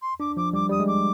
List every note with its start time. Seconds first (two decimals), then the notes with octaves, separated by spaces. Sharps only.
0.02 C6
0.20 D4 D6
0.37 F3 D6
0.53 G3 D6
0.69 G3 D#6
0.80 G#3
0.87 D6